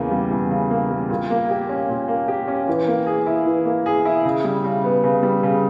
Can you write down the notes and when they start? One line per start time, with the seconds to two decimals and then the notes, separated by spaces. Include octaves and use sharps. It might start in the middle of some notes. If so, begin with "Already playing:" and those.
Already playing: E2 C#3 A#3
0.11 G3
0.31 E2
0.51 C#3
0.70 A#3
0.91 G3
1.10 A#2
1.30 A#3
1.50 G4
1.69 C#4
1.89 A#2
2.08 A#3
2.28 G4
2.48 C#4
2.68 E3
2.88 A#3
3.07 G#4
3.26 E4
3.45 E3
3.65 A#3
3.86 G#4
4.05 E4
4.25 C#3
4.44 G3
4.64 C#3
4.84 B3
5.04 C#3
5.23 G3
5.43 C#3